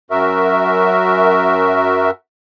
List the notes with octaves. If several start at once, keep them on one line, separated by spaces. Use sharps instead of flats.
F#2 F#4 A#4 E5